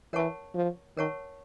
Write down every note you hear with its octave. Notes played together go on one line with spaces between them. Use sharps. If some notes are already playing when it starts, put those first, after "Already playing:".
E3 A#4 C#5 F#5 A5 C#6
F3
D#3 A#4 C#5 F#5 A5 C#6